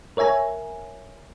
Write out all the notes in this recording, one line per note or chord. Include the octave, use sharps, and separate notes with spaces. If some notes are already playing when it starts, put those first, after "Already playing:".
A#4 C#5 E5 G#5 A#5